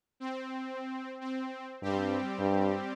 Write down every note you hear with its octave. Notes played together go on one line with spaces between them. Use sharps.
C4
C4
G2 G3 C4 G4
G2